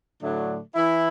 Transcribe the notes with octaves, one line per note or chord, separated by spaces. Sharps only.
A2 D3 F#3 A3 D4
E3 E4